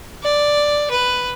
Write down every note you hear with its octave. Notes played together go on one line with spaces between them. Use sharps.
D5
B4